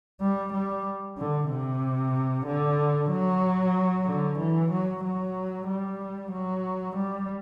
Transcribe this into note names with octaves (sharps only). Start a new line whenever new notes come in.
G3
G3
D3
C3
D3
F#3
D3
E3
F#3
F#3
G3
F#3
G3